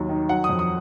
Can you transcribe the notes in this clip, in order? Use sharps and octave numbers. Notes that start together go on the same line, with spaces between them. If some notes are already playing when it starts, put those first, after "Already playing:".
Already playing: D#2 F#3
D#3
F#3 F#5
D#6
F2
D#6